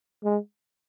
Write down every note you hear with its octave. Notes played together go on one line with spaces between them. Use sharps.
G#3